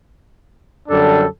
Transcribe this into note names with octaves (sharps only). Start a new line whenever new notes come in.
F#2 D3 G3 D4 A4